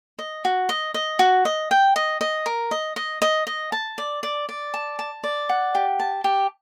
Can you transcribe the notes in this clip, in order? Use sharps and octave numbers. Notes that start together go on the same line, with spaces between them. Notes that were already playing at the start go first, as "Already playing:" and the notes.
D#5
F#4
D#5
D#5
F#4
D#5
G5
D#5
D#5
A#4
D#5
D#5
D#5
D#5
A5
D5
D5
D5
A5
A5
D5
F#5
G4
A5
G4